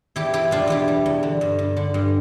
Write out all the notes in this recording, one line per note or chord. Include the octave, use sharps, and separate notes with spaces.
E2 E4 G4
B2 E4 G4
B2 D4 F4
E2 E4 G4
G3
E2
D3
G2
G2
D3
G2